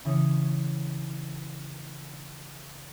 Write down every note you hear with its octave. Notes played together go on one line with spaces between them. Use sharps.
C#3 E3 C#4 D#6 G#6 C#7